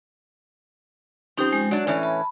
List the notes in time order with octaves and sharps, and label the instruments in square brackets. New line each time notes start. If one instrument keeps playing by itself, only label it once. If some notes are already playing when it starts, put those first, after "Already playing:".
[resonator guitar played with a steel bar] F3 C4 [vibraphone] C#4 D#4 G4
[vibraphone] G#3
[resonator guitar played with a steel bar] F#3 D4 [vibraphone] D5
[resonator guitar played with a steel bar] A2 E3 C#4
[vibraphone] A5 B5